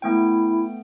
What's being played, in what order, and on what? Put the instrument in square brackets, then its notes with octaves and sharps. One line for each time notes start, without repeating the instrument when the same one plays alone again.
[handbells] A3 B3 G5 [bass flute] E4